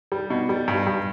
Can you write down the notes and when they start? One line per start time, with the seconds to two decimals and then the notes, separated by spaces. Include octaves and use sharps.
0.12 G3
0.30 B2
0.49 G3
0.68 G2
0.87 G2